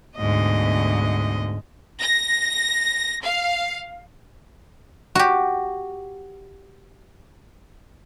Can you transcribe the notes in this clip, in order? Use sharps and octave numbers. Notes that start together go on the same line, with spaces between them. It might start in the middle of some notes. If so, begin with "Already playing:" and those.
D2 G#2 B2 D#5
A#6
F5
F#4 G4